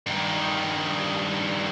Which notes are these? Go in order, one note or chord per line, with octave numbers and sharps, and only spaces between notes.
G2 D#3